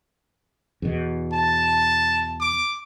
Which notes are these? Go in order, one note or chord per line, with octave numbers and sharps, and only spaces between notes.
E2 B2
A5
D6